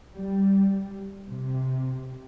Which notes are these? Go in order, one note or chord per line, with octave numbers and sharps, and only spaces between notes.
G3
C3